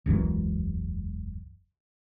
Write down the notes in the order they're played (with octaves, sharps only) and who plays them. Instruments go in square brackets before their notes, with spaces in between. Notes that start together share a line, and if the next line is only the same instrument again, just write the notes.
[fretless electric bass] E1 C#2 F#2 E3